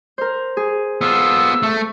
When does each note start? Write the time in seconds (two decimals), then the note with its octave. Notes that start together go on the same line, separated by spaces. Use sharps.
0.18 A#4 C5
0.57 G#4
1.01 B3 F4 E6
1.63 A3